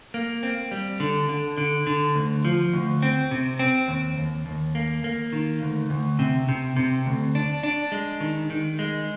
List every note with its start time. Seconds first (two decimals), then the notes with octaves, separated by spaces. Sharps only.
0.14 A#3
0.43 C4
0.72 G3
1.00 D3
1.29 D3
1.58 D3
1.87 D3
2.15 D2
2.45 F3
2.73 D2
3.03 C4
3.31 C3
3.59 C4
3.88 D#2
4.18 D#2
4.46 D#2
4.75 A#3
5.04 A#3
5.33 D#3
5.62 D2
5.90 D2
6.19 C3
6.49 C3
6.76 C3
7.06 D2
7.35 D4
7.63 D4
7.92 G#3
8.21 D#3
8.50 D#3
8.79 G#3